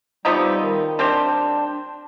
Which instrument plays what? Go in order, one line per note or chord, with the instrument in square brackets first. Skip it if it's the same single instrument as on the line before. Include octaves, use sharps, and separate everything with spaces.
[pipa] C3 F3 B3 D#4 [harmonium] G3
[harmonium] D#3
[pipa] G3 C4 G4 C5 [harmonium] D4